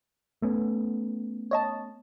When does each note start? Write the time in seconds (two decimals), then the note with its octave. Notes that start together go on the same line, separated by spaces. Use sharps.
0.42 A3 B3 C#4
1.51 C#5 D#5 A5